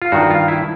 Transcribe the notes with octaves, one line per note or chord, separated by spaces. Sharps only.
F4
G2 D#3 F#4
F4
E4